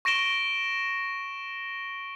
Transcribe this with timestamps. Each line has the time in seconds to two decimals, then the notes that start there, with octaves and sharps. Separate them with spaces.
0.05 C#6 A#6 D7 E7 G7